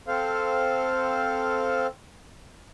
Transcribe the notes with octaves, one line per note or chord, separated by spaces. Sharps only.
C4 A4 C5 F5